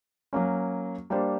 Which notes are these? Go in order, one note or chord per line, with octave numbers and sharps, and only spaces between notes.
F#3 A#3 C#4
G3 A#3 D4 G4 C5